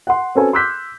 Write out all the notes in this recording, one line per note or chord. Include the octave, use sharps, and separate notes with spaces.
F#5 C6
C4 C#4 F#4 A4 B4 G#5
C6 D6 E6 F#6 G6 B6